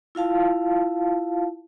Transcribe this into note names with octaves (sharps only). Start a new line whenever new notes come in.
E4 F4 F5 A5